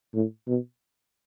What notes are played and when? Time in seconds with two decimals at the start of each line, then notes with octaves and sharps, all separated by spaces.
0.14 A2
0.48 B2